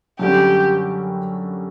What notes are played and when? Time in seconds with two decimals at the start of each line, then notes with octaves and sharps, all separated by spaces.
0.19 F#2 D3 G3 C#4 G4